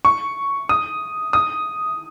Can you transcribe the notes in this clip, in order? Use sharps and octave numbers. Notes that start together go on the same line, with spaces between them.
C#6
D#6
D#6